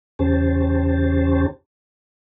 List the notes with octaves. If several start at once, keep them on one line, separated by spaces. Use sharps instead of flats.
E2 C#3 C#4 G4 C5 A5